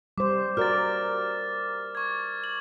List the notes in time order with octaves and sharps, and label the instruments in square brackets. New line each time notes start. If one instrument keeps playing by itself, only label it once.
[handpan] G3 C5 [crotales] D6
[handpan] F#4 A#4 D5 [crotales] F6 A6
[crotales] C#6 G#6
F#7